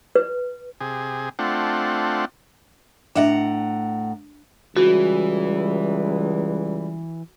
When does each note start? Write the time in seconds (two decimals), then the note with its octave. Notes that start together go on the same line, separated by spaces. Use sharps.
0.15 B4
0.81 C3 G#4
1.39 A3 C4 D4 F4 F#5
3.16 A2 D4 D#5 E5 F#5 A#5
4.77 C#2 E3 G3 F#4